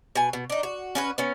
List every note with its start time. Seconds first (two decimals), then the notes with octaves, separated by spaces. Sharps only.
0.15 B2 G#5
0.33 B2
0.50 D4 D#4
0.63 F#4
0.95 C#4 F#4 B4
1.18 B3 C#4